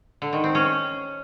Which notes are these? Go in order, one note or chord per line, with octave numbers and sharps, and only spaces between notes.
D3
D#3
C4
C#4